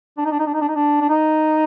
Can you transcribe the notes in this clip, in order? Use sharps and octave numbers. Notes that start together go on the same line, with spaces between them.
D4
D#4
D4
D#4
D4
D#4
D4
D#4
D4
D4
D#4